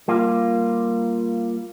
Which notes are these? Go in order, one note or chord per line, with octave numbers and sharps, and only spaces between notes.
G3 A#3 F4